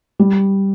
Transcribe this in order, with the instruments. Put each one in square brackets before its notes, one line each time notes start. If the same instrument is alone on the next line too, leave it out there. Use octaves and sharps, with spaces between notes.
[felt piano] G3